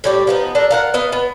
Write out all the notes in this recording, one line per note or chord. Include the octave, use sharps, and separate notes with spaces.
A2 G3 G4
F3 B3 D#4
D4 A4 A#4
F4 A#4 F#5
B3 D#5 F5
B3